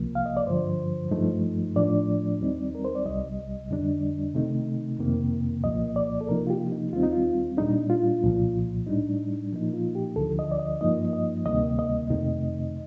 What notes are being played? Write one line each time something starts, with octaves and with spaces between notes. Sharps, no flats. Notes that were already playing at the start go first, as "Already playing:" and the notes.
Already playing: C2 C3 F3 A#3
F5
D#5
D5
G2 D3 F3 C5
G2 F3 A3 D#4
A2 F3 A3 D4 D5
D#2 D#3 G3 C4 D#4
A#4
C5
D5
C2 C3 G3 D#5
F2 D3 G3 D4
C3 D#3 A3 D#4
F2 C3 D#3 A#3
C2 A#2 F3 A#3 D#5
D5
A4
C3 F3 A#3 D#4 A#4
F4
G4
D#4
D#2 D#3 G3 C4 D#4 F4
D#4
F4
A#2 G3 D4 D#4
F4
C2 A#2 F3
A2 G3 D4 D#4
A#2 F3 A#3 D#4
F4
G4
D2 D3 F3 A4
D#5
D5
D#5
G2 F3 A#3 D#4 D#5
D#5
D2 C3 D#3 G3 A#3 D#5
D#5
F2 C3 D#3 A3 D#4